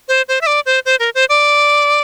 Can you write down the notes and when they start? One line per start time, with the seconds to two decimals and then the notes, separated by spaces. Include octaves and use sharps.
0.08 C5
0.28 C5
0.41 E5
0.47 D5
0.66 C5
0.85 C5
1.00 A#4
1.15 C5
1.29 D5